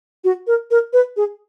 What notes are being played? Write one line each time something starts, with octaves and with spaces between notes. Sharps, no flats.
F#4
A#4
A#4
B4
G#4